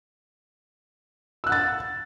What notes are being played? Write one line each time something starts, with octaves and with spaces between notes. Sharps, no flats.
F#5 E6 F#6 A6